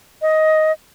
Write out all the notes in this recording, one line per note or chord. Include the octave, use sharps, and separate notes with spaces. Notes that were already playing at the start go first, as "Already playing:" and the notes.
D#5